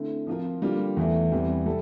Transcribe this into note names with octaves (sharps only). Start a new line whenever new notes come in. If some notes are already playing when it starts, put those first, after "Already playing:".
Already playing: D3 A3 C4 E4
F3 C4 F4 A#4
D3 G3 A#3 F4
E2 E3 A3
E2 E3 G3 C4
C3 G3 A4